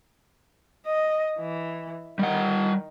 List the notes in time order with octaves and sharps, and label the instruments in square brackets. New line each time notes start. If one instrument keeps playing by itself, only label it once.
[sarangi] D#5
E3
[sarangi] D#3 [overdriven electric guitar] G3 F#5